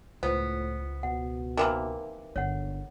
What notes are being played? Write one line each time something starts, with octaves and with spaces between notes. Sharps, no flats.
C#2 A2 B3 F4 C5
B2 F#5
C3 E3 A#3 D#4 A#4 D6
G1 D3 C#5 F#5